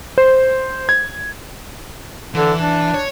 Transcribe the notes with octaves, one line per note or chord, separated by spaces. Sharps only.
C5
G#6
D3 E3
D4
C#5